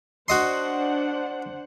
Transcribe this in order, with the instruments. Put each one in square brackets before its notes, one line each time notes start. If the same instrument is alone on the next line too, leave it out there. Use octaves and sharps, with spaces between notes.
[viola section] D4 C5 F#5 [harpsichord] F#4 D#5 C6